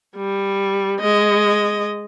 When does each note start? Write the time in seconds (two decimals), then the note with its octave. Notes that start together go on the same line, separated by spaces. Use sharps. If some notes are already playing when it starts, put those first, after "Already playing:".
0.16 G3
1.00 G#3 D#5